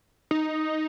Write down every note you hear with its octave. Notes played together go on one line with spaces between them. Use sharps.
D#4